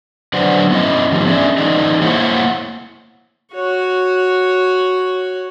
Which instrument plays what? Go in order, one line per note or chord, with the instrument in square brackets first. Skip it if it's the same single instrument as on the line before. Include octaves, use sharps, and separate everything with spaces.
[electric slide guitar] D3 F#3 B4 C5 D5 F#5
B3 C#4 E4 B4 D#5
A2 D#3 F3 D#4 G4
B3 C#4 D4 G#4 D5 E5
E3 D#4 G#4 D5 D#5
A#3 E4 C5 C#5 E5 F#5
[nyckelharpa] F#4 C#5